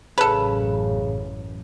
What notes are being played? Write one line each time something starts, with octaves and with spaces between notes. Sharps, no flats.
A1 F#2 C#3 A4 B4